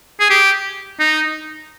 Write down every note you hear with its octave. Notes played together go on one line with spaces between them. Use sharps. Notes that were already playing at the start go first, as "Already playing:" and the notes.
G#4
G4
D#4